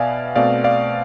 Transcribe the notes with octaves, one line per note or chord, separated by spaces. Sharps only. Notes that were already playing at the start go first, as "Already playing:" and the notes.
Already playing: B2 B3 D5 E5 F5 G#5
B2 A3 C4 D5 F5
D5 F5